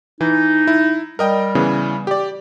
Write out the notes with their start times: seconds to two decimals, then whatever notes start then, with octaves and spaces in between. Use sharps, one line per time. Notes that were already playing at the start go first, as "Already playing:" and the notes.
0.21 E3 D#4
0.67 E4
1.19 G3 A#4 D#5 G5
1.55 C#3 E3 B3
2.07 G4 D5